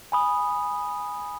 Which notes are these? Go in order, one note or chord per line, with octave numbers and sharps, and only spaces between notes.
G#5 B5 D#6